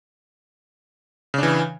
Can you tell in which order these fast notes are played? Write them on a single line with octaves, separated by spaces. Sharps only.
C#3 D4 E3